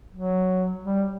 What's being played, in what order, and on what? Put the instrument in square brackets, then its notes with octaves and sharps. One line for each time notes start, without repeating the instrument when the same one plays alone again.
[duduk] F#3
G3